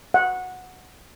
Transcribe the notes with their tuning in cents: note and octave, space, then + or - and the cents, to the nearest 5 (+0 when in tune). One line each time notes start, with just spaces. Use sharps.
F#5 -10